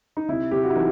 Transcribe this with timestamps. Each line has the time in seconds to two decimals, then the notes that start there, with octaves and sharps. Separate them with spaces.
0.17 D#4
0.29 C3 E4
0.51 C3 G4
0.63 F#4
0.70 E4
0.76 E3 D#4